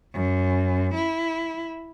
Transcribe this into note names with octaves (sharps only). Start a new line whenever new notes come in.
F#2
E4